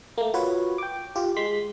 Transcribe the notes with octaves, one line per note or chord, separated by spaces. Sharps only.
A3 A#3
F4 F#4 B4 C#5
G5 D6
F4 G4
G#3 C6 B6